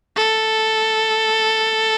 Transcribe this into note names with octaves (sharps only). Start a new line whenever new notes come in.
A4